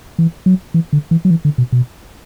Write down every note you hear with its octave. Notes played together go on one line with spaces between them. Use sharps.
E3
F#3
E3
D3
E3
F#3
E3
D3
B2
B2